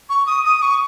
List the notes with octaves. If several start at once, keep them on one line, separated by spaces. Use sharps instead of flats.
C#6
D#6
D#6
C#6